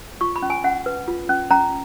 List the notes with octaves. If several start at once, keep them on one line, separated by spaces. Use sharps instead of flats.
F4 C#6
B5
C#4
G#5
C#4 F#5
B4
F4
C#4
C#4 A#5